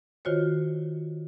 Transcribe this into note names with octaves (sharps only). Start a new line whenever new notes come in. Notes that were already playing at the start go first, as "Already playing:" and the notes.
D#3 F4 F#4 C5 C#5